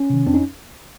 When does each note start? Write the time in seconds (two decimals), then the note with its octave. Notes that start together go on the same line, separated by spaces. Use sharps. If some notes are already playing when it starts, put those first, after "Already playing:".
Already playing: C#4
0.10 C3 D#3
0.26 F2 C4 D4
0.34 C#4 D#4